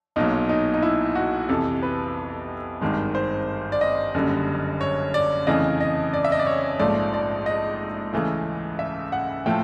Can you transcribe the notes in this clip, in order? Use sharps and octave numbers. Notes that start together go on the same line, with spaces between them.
B1 A#2 F#3 D#4
D#4
D#4
E4
F#4
F2 C3 E3 A4
B4
G#1 G2 D#3 G#3
C5
D5
D#5
F#1 F#2 D3 G3
C#5
D5
F2 C#3 E3 A3 D#5
D#5
D5
E5
D#5
D5
C#5
A#1 G#2 F3 A3 D5
D5
D#5
C#2 C#3 E3 A3
E5
F#5
A2 F3 A3 G5